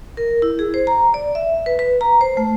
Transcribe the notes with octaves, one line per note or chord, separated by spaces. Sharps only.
A#4
E4
G#4
C5
A#5
D5
E5
B4
B4
A#5
C5
A3